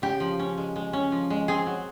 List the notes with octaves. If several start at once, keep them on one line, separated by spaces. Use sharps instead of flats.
C#3 G4
F3
C#4
G#3
G#3
C#4
F3
G#3
C4 G#4
F#3